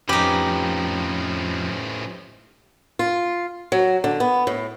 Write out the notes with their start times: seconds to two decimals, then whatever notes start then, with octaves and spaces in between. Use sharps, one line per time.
0.09 F2 A2 F3 C#4 D#4 G4 B4
2.99 F4
3.72 F#3
4.04 D3
4.20 B3
4.47 A2